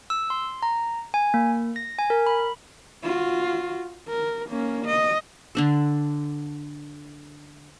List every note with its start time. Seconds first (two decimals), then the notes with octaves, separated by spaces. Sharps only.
0.10 E6
0.30 C6
0.63 A#5
1.14 G#5
1.34 A#3
1.76 A#6
1.99 G#5
2.10 A#4
2.27 B5
3.03 F4 F#4
4.08 A#4
4.49 A#3 C#4
4.86 D#5
5.55 D3 D4 A4